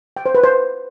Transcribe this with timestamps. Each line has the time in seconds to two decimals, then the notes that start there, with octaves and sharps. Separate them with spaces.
0.17 G5
0.26 C5
0.35 B4
0.44 C5